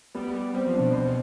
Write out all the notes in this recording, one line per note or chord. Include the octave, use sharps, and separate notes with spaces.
G3 B3
G3
G3 C4
F3
D4
B2
C5